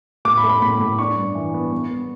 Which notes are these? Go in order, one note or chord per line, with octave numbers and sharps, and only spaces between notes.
A2 D6
B5
A3
B5
A2 B5
A2 B5
D4 C#6
G2
E3
B3
B3
B3